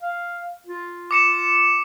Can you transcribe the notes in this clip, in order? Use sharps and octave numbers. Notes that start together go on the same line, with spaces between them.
F5
F4
D6 C#7 E7